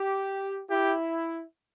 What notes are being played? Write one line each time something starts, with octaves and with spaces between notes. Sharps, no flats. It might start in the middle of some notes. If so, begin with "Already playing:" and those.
Already playing: G4
E4 G4